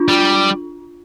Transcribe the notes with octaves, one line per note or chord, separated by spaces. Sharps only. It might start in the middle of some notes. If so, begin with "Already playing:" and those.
Already playing: D4 F4
G3